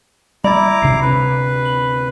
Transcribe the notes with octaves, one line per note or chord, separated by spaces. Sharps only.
G3 E4 A#5 B5 D6 A6
D2 C3 D4 C7
B4
F#7